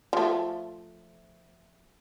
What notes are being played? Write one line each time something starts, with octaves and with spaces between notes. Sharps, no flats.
F3 A3